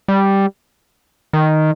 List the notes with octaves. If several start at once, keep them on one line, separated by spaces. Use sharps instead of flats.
G3
D#3